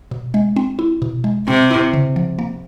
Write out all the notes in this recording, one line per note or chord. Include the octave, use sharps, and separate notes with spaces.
B2
G#3
C4
E4
B2
G#3
C3 C4
E4
C#3
F3
A#3